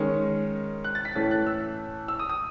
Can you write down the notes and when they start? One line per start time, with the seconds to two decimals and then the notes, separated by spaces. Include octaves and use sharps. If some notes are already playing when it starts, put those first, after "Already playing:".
Already playing: D#3 G#3 C#4
0.84 F#6
0.95 A6
1.05 B6
1.15 A2 E3 A3 C#4 A6
1.31 F#6
1.47 E6
2.08 E6
2.19 D#6
2.29 D#6